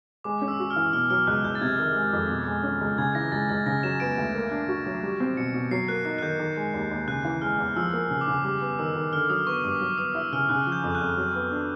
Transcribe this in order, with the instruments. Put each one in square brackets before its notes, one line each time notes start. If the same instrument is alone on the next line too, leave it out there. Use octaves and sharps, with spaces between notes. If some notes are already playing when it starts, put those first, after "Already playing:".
[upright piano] G#3 [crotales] D6
[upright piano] C#4
[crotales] E6
[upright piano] F#4
[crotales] F6
[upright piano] E3
[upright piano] B2 [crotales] F6
[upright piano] F#3 [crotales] F6
[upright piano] C#2 [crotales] F#6
[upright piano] C#2 [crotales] G6
[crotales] A6
[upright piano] C3 [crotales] G#6
[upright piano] D#3
G#3
F2
B2
G#3
C#4
C#2
[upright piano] C#3 [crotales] G#6
[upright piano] E3 [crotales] A#6
[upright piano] C#2 [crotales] A6
[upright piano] C#2 [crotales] A6
[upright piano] C#3 [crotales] A#6
[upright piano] F#3 [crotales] E7
[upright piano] B3 [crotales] D7
[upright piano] D2
A#3
D4
F#4
F#3
G3
C4
[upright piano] B2 [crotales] C#7
[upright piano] B2
[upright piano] F#3 [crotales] C7
[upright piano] A#3 [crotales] F#6
[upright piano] D#4 [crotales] F#6
[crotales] F#6
[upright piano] D#3 [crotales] G6
[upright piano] D#3
G#3
D#2
D#2
[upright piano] C#3 [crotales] F#6
[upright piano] E3
[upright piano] G#3 [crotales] F6
[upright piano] E2
[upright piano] F3 [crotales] E6
[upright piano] A#3
C#3
[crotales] D6
[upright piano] C#3
[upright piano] G3 [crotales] D6
[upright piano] B3
[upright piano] D#3 [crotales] E6
[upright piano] D#3
[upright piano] D3 [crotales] F6
[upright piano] F#3 [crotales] D#6
[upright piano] B3 [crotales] C#6
[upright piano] G2 [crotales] D6
[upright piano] F#3
[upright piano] B3 [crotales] D#6
[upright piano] E4 [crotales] E6
[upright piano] C#3 [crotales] F6
[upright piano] C#3 [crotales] F#6
[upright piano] F3
[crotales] G6
[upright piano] F2
[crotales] F#6
[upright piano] F2
F#3
B3
D4